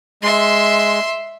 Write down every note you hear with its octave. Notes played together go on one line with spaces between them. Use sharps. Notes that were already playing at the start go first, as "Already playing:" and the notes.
G#3 E5 C6